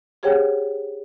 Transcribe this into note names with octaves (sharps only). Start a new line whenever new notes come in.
G4 G#4 C5 C#5 F#5 G5